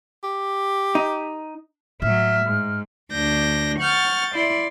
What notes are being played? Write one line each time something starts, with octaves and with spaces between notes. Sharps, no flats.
G4
D#4
A2 F#3 E5 F6
G#2
D2 D4 G6 A#6
F#5 C#6 F6 G6 A6
E4 D5 C6